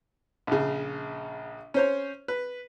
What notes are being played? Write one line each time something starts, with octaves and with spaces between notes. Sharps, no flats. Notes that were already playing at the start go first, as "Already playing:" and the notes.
A#1 C#3
C#4 C5 C#5
B4